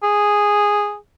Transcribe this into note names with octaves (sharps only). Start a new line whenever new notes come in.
G#4